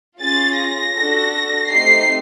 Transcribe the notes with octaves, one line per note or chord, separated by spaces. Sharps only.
C#4 F4 G#4 A6
A#6
D4 F#4 A4
A3 C4 D#4 G4 C7